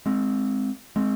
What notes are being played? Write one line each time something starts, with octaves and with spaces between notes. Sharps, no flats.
G#3 C4
G#3 C4